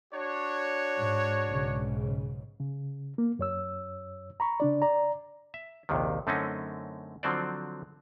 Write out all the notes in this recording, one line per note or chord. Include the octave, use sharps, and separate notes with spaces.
D4 F#4 C#5
G#2
B1 G#2 C#3
C#3
A#3
F#2 C#5 E6
A#5 B5 C#6
C#3 D4 D5
D5 A#5
E5
A#1 D#2 C3 D#3
F#2 D3 A3 C4 C#4 D#4
D3 F3 F#3 C4 C5 D5